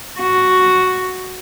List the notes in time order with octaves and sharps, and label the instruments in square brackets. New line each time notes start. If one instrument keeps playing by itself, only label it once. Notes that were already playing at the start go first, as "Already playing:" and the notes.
[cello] F#4